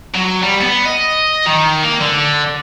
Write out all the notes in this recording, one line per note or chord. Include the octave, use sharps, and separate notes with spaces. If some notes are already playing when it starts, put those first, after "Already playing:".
F#3
G3
B3
D#5
D#3
A#3
D3